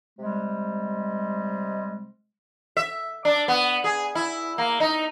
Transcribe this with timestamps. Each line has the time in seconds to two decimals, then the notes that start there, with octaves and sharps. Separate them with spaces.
0.19 C3 G3 G#3
2.77 E5
3.25 D4
3.48 B3
3.84 G#4
4.15 E4
4.58 A#3
4.80 D#4